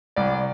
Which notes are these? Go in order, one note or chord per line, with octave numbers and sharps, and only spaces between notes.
C2 D5